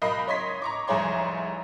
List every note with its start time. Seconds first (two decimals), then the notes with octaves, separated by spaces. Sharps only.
0.02 B1 A#4 D#5 B5 C7
0.28 C#5 D#5 C6 G#6 B6
0.62 A#5 C#6 D6
0.88 F1 C2 G#4 C#5 A#5 C6